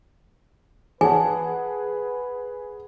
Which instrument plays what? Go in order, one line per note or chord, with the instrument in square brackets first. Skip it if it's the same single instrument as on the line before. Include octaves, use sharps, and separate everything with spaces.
[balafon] E3 A5 [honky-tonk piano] G#4 F#5 [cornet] B4 [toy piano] G#5